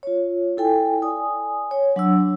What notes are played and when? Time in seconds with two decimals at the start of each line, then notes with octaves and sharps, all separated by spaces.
0.03 F4 C#5
0.57 E4 A4 G5 G#5
1.02 D5 G#5 D#6
1.71 C#5
1.96 F#3 D4 F#5 E6